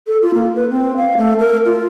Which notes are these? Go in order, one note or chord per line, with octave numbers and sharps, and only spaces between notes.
A4
F4
A#3
B4
C4
F5
A3
A#4
F4